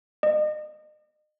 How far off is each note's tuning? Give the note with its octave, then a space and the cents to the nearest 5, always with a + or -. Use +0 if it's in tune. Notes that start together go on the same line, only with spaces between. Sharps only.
D#5 -35